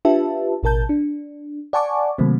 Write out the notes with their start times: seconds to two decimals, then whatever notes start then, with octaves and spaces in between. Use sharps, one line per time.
0.05 D4 F4 G4 B4 E5 A5
0.63 A1 B2 A#4 A5 G6
0.89 D4
1.73 D5 F#5 G#5 A5 C#6 D6
2.18 C3 D#3 F#3 A3 A#3 C4